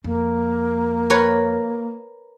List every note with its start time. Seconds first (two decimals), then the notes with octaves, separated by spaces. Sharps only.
0.04 F2 A#3
1.10 A#4 B4 C#5